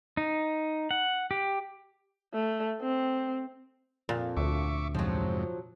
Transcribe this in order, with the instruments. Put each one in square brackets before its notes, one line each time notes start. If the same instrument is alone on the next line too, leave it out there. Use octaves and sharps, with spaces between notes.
[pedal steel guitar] D#4
F#5
G4
[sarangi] A3
C4
[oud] F2 [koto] A#2
[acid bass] D2 [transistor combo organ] E5 C#6 D6
[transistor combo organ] F2 G#2 C3 [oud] F3 F#3